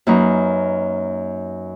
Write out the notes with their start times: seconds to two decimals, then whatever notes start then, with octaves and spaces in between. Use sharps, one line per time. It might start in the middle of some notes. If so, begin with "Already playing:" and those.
0.07 F#2 A#3 D#4 F#4 B4